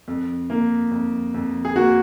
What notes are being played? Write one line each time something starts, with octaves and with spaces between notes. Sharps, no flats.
F2
A#3
F2
F2
G#4
A#3 F#4